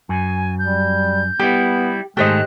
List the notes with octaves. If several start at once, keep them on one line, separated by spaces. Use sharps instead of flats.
F#2 G#5
G3 G6
G3 B3 E4 G4
G#2 D#3 G#3 A3 G4 C5 D#5 F#6